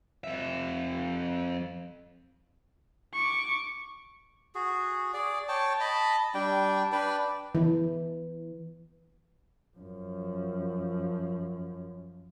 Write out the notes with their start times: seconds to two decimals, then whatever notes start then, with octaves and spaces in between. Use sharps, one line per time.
0.24 F2 E5
3.14 C#6 D6
4.55 F#4 G#4
5.14 G#4 D5
5.48 C#5 G5 A5
5.80 D#5 A5 B5
6.34 G3 D4 G5
6.92 D4 B4 D5 G5
7.55 E3
9.78 F#2 F3